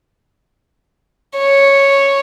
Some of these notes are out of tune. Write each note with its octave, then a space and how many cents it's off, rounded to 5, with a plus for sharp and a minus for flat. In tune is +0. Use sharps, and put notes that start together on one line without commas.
C#5 -5